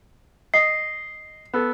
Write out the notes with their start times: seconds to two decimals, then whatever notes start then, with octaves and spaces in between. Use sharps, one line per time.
0.54 D#5 C7
1.53 B3 A4